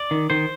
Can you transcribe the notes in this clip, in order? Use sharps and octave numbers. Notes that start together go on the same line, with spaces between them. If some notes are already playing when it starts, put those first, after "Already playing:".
Already playing: D5
D#3
D#3 C5